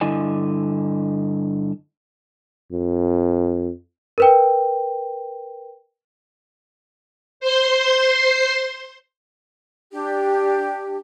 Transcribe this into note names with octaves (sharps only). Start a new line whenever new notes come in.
G2 D3 E4 D#5 G#5
F2
A#4 B4 G5
C5 C6
D4 G4